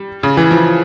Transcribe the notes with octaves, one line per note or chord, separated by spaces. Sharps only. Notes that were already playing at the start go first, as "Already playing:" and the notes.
Already playing: G3
C#3
E3
F3